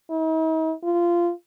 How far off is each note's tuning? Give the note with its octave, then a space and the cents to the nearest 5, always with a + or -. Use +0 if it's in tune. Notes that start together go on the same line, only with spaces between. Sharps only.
D#4 +45
F4 -15